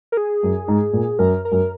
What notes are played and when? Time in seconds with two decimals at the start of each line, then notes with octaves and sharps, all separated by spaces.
0.12 A#4
0.17 G#4
0.43 F#2
0.68 G#2
0.93 A#2
1.19 F#2 A#4
1.45 A#4
1.52 F#2